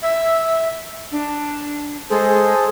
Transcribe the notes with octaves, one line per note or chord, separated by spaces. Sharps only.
E5
D4
G#3 G#4 A4 C5